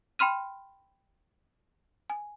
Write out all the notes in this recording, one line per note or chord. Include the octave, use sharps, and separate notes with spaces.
G5 B5 C6 F6 D#7
G#5